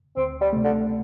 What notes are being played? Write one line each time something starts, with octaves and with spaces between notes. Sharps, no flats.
D2 C4
G3
C3 A3
D3